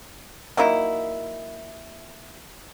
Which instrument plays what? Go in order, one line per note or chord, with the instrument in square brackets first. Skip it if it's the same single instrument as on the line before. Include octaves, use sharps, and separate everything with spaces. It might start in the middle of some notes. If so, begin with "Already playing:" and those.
[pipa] F#3 A#3 D#4 E4